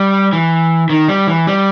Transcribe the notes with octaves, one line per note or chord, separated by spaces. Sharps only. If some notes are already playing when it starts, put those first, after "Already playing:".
Already playing: G3
E3
D#3
G3
E3
G3